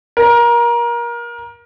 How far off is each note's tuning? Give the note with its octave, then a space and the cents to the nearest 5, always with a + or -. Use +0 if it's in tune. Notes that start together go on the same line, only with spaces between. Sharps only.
A#4 +25